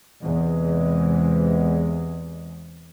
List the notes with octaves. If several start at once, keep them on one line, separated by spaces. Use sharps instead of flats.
E2 C3 G#3